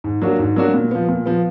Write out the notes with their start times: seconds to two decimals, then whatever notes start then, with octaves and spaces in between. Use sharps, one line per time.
0.04 G#2
0.22 F#3 A#3 D4 F#4
0.39 G#2
0.56 F#3 A#3 D4 F#4
0.74 A#2
0.91 F3 B3
1.09 A#2
1.26 F3 B3